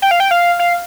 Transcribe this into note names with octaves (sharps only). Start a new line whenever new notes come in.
G5
F5
G5
F5
F5